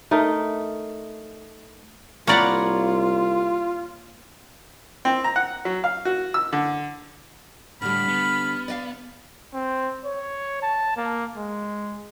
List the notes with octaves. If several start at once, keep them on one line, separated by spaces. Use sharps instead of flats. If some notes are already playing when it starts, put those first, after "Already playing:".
A3 D#4 A#4
C2 A#3 F4 C#5 D5 F#5 A#5 B5
C4
A#5
F#5
F#3
F5
F#4
E6
D3
A2 D3 G3 B5 F6
B3
D5 D#5 F5
C4
C#5
A5
A#3
G#3